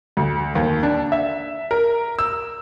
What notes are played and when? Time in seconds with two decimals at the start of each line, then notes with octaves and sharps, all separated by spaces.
0.17 D2
0.55 D#2
0.83 D4
1.12 E5
1.71 A#4
2.19 E6